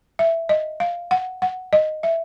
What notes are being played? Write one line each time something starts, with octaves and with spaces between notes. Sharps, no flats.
E5
D#5
F5
F#5
F#5
D#5
E5